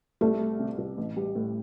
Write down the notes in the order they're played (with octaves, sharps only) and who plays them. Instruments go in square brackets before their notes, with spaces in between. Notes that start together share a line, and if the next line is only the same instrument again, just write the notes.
[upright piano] C2 [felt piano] A3
[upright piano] G3
C3
C2
A1
G3
A2